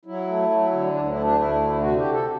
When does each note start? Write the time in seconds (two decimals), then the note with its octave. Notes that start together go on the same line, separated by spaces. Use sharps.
0.05 F#3 E4
0.27 A3
0.50 F#3
0.72 D3
0.93 D2 D4
1.05 D4
1.09 E4
1.16 A3
1.23 D4
1.38 D2 E4
1.61 D3
1.82 C3 F#4
1.97 G4
2.04 C3
2.12 A4